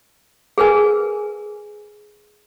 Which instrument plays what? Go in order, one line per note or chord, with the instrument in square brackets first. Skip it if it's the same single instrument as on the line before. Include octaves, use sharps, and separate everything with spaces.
[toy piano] G#4 A#4 B4 G#5